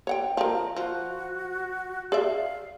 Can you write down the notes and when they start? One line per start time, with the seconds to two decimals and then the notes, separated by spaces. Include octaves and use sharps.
0.07 C#5 F#5 G5
0.37 F3 A#4 A#5
0.76 F3 F#4
2.12 G#4 D5 E5 F5